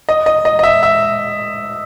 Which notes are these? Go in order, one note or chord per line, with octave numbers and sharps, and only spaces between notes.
D#5
D#5
D#5
D#5
E5
E5